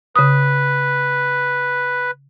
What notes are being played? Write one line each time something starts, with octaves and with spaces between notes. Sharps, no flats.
C#3 B4 D#6